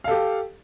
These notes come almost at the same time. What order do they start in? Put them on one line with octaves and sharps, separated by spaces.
F5 A4 G4